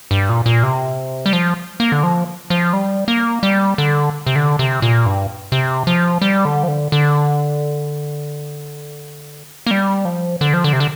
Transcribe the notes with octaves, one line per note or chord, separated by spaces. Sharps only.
G2
A#2
A#2
C3
G3
F3
A#3
D3
F3
F3
G3
A#3
G3
D3
C3
D3
C3
A#2
G2
C3
F3
G3
D3
F3
D3
D3
A#3
G3
F3
D3
F3
D3
C3
D3